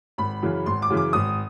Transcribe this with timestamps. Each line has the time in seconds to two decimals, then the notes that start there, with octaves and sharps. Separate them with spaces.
0.18 G#1 B5
0.43 F#2 C#3 E3
0.66 G#1 C6
0.82 D6
0.90 F#2 C#3 E3
0.97 D6
1.13 G#1 D#6